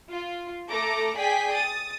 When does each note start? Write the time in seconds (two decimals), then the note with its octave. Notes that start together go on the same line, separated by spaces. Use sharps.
0.10 F4
0.70 A3 A4 A#5 D6 A#6
1.18 G#4 D5 G5 G#5 B6
1.53 D#6 A6